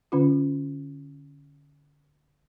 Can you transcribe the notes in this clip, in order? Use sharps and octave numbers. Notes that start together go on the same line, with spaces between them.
D3 C#4 F4